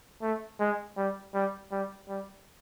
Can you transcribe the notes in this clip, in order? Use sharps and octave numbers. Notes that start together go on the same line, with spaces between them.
A3
G#3
G3
G3
G3
G3